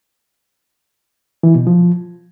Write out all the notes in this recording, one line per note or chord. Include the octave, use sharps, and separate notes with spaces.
E3
B2
F3